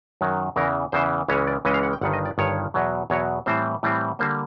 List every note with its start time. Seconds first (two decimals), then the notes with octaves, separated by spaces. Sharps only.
0.21 F#2 D#3 F#3
0.56 E2 C#3 E3 A#4
0.92 E2 C#3 E3 C5
1.28 C#2 C#3 E3 G#3 C#4 C#5
1.47 D5
1.65 C#2 C#3 E3 G#3 C#4 D#5
1.74 F5
1.83 F#5
1.93 G5
2.01 G1 G2 D#3 F#5
2.13 D#5
2.26 D5
2.38 G1 G2 D#3 C#5
2.74 E2 B2 F#3
3.10 E2 B2 F#3 C#5
3.46 A2 E3 G3 C4 C5
3.83 A2 E3 G3 C4
4.19 D3 G3 A#3 C5